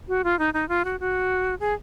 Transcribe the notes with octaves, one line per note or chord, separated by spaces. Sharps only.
F#4
F4
D#4
D#4
F4
F#4
F#4
G#4